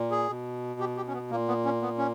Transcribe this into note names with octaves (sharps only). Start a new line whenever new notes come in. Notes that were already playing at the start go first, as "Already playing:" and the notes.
Already playing: A#2
G#4
B2
G4
G4
C#4
B3
A#2 A#3
B3
C#4
B3
C#4